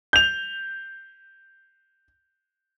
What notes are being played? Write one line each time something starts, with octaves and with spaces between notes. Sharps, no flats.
G6 F7